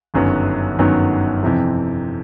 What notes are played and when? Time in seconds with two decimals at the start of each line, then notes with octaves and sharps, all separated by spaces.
0.14 G1 F#2 D#3 F#3 B3
0.78 G1 F#2 D#3 F#3 B3
1.43 F2 C3 E3